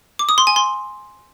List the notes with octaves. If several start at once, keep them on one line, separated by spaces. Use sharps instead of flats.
D6
D#6
C6
G#5
C6